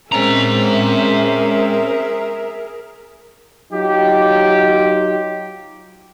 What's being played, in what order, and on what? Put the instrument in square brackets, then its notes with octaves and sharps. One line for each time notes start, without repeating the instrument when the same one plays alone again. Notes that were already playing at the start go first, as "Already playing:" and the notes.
[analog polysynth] G#3 C4 C#4 [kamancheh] G#4 A#4 [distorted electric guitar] C5 A#5 [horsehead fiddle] E5
[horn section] F#3 D#4 F4 G4